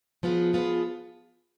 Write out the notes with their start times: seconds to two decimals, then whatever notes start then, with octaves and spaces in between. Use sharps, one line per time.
0.23 F3 B3 F4 G#4
0.53 F3 B3 F4 G#4